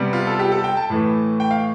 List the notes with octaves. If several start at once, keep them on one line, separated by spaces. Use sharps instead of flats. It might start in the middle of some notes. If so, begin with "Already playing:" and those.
Already playing: C3 G3 B3
F4
A4
G4
A4
G5
A5
A2 E3 A3
G5
F5